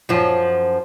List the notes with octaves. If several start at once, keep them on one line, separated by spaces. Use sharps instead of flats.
F#2 F3